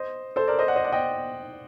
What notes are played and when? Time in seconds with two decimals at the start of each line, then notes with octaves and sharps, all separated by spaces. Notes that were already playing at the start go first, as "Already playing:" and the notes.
Already playing: C5 D#5
0.36 A4 C5
0.48 A#4 D5
0.59 C5 D#5
0.67 D5 F#5
0.76 C5 D#5
0.84 D5 F#5
0.92 D#5 G5